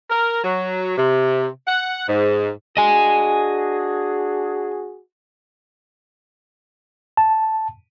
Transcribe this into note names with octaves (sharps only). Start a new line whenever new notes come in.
A#4
F#3
C3
F#5
G#2
D4 F#4 G#4 D#5 G#5
A5